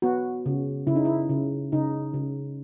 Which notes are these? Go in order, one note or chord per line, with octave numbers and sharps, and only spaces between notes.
B3 F#4
C#3
C#3 E4
D#4
E4
C#3
C#3 D#4
C#3